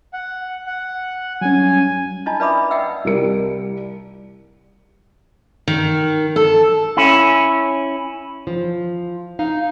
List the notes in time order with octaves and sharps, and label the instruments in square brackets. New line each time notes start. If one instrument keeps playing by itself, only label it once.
[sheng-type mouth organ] F#5
F#5
[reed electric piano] F#3 G3 C#4 [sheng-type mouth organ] G#5
[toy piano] D4 E4 F4 D#5 A5
B4 D5 E5 B5 D6 D#6
D#5 E5 F#5 G5 E6
[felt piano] C2 G3 A#4 C#7
[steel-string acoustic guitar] D#3
A4
[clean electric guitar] C#4 E4
[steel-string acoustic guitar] F3
[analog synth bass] D#4 [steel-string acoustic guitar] F5